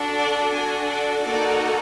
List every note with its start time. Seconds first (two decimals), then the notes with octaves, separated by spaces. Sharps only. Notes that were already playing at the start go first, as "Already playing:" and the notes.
Already playing: D4 F#4 A4
0.18 D5
0.53 D4 F#4 A4 G#5
0.90 D5
1.25 A#3 D#4 F#4 A4 D5